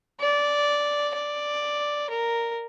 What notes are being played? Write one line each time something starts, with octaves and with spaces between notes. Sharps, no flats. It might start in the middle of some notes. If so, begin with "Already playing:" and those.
D5
D5
A#4